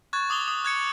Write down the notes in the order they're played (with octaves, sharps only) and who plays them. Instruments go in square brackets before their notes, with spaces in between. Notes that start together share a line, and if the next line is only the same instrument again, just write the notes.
[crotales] C#6 F#6 G#6 A6
D6 D#6 F7 G7
D#6
F#6 G#6 C#7